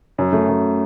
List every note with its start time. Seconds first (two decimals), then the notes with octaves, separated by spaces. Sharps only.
0.18 F#2
0.33 A3
0.48 F#2